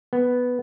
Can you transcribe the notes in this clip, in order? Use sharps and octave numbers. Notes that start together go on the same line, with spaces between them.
B3